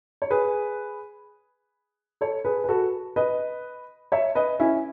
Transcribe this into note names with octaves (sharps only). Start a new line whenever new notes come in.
C#5
G#4 B4
A4 C#5
G#4 B4
B4
F#4 A4
B4 D#5
C#5 E5
B4 D#5
C#4 E4